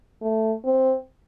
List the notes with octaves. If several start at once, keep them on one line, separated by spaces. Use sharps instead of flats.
A3
C4